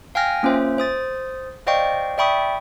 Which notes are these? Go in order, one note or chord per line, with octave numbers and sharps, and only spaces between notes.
F5 G5 G#5 F6 A#6
A#3 C#4 F4 C5 E5
C5 D#6 A6
C5 D5 D#5 F5 G5 C#6
D5 E5 G5 B5 C#6 D#6